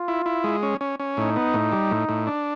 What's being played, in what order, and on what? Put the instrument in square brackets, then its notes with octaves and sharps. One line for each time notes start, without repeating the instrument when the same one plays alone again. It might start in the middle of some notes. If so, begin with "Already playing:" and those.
Already playing: [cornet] F4
[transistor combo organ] E4
E4
G#3
C#4
C#4
C#4
[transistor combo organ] A2 [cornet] D#4
[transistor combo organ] B3
A2
G3
A2
A2
D4